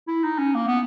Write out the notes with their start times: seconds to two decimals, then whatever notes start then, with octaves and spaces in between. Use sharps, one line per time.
0.08 E4
0.23 D#4
0.38 C#4
0.54 A#3
0.67 B3